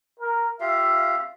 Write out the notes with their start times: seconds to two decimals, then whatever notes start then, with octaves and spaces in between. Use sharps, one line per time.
0.19 A#4
0.60 F4 G4 E5 F5